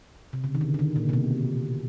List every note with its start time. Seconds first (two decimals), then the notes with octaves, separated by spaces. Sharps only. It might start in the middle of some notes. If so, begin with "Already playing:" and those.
0.33 C3
0.44 C#3
0.55 D#3
0.61 D3
0.74 D3
0.79 D#3
0.96 A#2
1.09 C3
1.13 B2